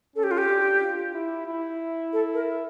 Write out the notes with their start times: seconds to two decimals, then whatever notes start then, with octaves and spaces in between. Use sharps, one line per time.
0.16 C#4 A4
0.24 G4
0.31 F4
0.38 G4
0.49 D4
0.82 F4
1.14 E4
1.47 E4
2.13 A4
2.34 A#4